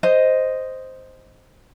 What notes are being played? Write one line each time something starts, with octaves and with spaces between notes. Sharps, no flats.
C5 D#5